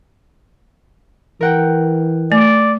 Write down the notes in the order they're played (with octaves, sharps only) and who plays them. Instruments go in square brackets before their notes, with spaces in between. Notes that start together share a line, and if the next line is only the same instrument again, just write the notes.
[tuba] E3 [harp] A#4 F#5 G5
[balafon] A3 [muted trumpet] D5